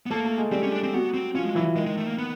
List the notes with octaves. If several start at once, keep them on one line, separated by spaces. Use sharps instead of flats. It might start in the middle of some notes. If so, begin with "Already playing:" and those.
B3
A3 A#3 A4
A3 A4
G#3 G#4
G3 C4 G4
C#4
D4
C4
F#3 B3 F#4
C4
F3 C#4 F4
G#3
E3 F#3 E4
D#3 G#3 D#4
G#3
A3
A#3
B3